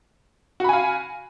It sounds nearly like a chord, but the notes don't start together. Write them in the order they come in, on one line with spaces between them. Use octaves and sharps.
F#4 B5 G#5 F5